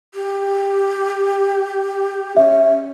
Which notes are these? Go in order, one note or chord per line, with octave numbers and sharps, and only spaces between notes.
G4
C#4 E5